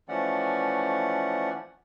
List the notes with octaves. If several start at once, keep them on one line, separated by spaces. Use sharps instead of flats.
E3 F3 A3 C#4 D5 F#5